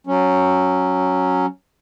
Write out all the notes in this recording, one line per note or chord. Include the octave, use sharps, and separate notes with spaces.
F#3 C#4